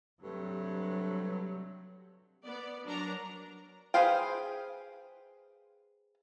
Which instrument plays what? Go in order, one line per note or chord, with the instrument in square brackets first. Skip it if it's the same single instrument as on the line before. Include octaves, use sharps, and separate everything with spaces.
[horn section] G2 C3 A3 [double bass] F#3
[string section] B3 D5
F#3 D4 A#4 A#5
[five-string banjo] G#4 B4 C5 F5 G5